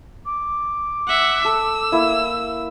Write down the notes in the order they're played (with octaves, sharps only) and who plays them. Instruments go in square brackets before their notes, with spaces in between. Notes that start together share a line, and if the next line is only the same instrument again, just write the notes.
[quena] D6
[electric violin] E5 F#5
[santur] A4 [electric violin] E6
[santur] A#3 E4